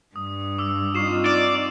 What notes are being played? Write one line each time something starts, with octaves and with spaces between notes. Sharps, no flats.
G2 D#6
D6 E6
C4 D#4 F4 C#6 C7 E7
D5 D6